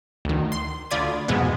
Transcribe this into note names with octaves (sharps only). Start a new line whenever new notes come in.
D2 D#3
C6
D2 F4 D5 B5 D#6 G#6
F2 G#2 B2 E3 G#3 B3